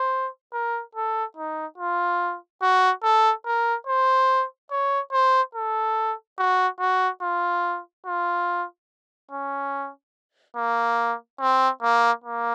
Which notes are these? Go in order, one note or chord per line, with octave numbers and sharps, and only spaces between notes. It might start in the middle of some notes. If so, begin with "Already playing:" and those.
Already playing: C5
A#4
A4
D#4
F4
F#4
A4
A#4
C5
C#5
C5
A4
F#4
F#4
F4
F4
C#4
A#3
C4
A#3
A#3